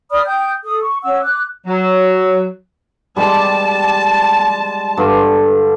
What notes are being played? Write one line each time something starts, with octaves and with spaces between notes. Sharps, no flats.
D5 B5 D#6 F6
G5 D#6 G6
A4 D#6
C#6
C#4 F#5 E6
D6 F#6
F#3
G3 G#3 G4 A5
G2 D3